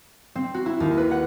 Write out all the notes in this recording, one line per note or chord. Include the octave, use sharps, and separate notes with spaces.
C4
F#4
E4
D#2
B4
F#5